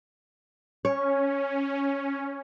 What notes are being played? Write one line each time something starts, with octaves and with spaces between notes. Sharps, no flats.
C#4 C#5